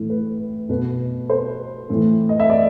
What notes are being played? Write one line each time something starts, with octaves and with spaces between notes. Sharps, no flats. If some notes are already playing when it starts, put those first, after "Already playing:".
Already playing: A2 E3
B4
B2 B4
C5
A2 E3
D#5
E5
D5